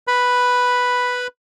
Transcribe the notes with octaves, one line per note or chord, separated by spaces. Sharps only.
B4 B5